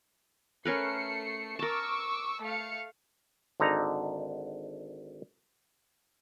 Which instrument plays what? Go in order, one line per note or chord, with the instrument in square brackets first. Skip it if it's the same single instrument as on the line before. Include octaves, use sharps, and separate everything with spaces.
[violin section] A3 C7 C#7 [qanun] C#4 A#4 B4
[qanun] A#4 A5 [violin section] C#6 D6 E6
[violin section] A3 F5 C#7
[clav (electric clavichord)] G#1 D3 D#4 A#5